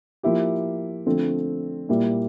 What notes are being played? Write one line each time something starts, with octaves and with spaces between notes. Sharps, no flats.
F3 A#3 E4 G4
D3 F3 A3 C4
A#2 G3 A#3 E4